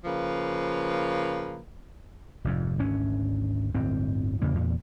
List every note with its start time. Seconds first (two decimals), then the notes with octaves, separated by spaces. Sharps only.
0.05 C#3 F3 A#3 B4
2.45 F1 F2 G#2
2.79 G#1 D2 C#4
3.75 D1 G1 C4
4.42 E2 C#3 A#3
4.54 E2 A#2